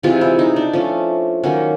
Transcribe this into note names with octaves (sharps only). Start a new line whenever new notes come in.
C3 E3 G#3 F4
E4
D#4
D4
F3 A3 C#4
D#3 F#3 A#3 C#4